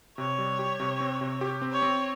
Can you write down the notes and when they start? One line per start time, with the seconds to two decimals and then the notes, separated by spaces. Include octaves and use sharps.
0.18 C3 C#5
0.38 G3
0.59 G4
0.80 C3
1.00 C4
1.21 C3
1.41 G4
1.62 C4
1.72 C#5
1.82 C4